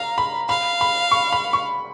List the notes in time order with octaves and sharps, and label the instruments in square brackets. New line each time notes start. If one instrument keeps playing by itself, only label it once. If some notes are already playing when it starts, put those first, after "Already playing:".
Already playing: [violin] F5 [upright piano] A#5
[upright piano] B5
[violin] F5 [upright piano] B5
[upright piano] B5
C#6
B5
C#6